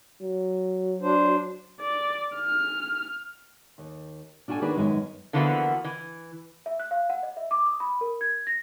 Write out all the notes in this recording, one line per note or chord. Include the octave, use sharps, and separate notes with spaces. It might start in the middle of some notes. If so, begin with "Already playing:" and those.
F#3
D4 C5
D5
F6
D#2
D4 F4 F#4 A4 G#5
D#3 A#3 D4 F#4 G#4 B4
F#2 D#3 G#3 B3 G#4
D3 E3 F3 A#3 B3 F#4
E3
E5
F#6
F5
F#5
D#5
E5
D6
D#6
B5
A#4
G#6
A#6